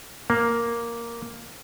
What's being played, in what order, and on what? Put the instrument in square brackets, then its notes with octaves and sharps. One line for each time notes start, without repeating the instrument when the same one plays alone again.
[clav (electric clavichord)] A#3